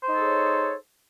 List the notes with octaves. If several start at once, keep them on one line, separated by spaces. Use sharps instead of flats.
D#4 G#4 A4 C5 C#5